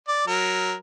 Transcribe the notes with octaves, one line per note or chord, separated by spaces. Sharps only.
D5
F#3 A#4